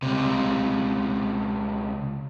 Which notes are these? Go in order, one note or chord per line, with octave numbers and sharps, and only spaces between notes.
C#2 C3